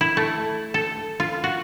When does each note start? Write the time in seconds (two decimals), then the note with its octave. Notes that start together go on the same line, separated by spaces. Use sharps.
0.01 E4
0.17 A3
0.74 A4
1.20 F4
1.44 F#4